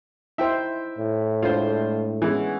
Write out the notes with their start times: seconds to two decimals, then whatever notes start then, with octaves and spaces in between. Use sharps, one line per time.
0.38 D#4 E4 C5 E5 G5
0.99 A2
1.43 G#3 A3 D4 F4 C5
2.22 E3 G#3 B3 C#4